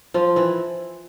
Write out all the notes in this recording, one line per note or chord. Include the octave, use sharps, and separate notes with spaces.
F3 F4
E3 E4